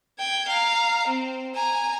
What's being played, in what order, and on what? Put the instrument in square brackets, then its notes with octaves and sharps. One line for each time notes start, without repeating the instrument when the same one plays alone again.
[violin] G5 G#6
F5 A#5
C4
G#5 A#5